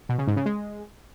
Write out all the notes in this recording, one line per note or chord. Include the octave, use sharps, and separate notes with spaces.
B2
C#3
G#2
C#3
G#3